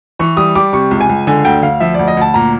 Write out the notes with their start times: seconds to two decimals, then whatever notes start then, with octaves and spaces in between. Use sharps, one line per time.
0.19 E3 C#6
0.37 G3 D#6
0.55 G3 D6
0.73 C3 C#6
0.91 C#2
1.01 G#5
1.09 C#2
1.27 D3 G#5
1.45 D2 G5
1.62 D2 F5
1.80 F3 E5
1.94 D2 D5
2.08 D#5
2.17 D2 A5
2.34 A#2 A#5